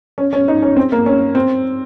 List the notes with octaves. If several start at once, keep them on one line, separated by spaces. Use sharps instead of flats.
C#4
C#4
D#4
C#4
C4
A#3
C#4
C4